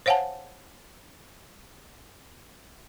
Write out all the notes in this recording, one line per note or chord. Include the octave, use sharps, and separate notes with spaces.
C5 C#5 F5 F#5 G#5 A5